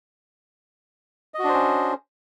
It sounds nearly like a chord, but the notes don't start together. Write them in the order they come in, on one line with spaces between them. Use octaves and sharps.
D#5 F#4 D4 C5 C#4